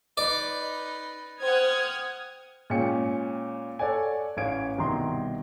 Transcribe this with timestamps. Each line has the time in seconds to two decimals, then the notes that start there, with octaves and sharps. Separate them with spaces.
0.17 D#4 B4 D5
1.41 C5 F#5 G5 D#6 F6 G#6
2.70 A#2 G#3 C#4 G5 C#7
3.79 A4 C#5 D5 F#5 G#5
4.37 A1 C#4 F5 G#6 D7
4.78 C2 B2 D#3 A#5 C6